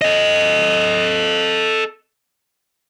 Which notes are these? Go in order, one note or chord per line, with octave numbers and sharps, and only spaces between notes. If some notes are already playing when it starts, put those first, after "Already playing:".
A4 D#5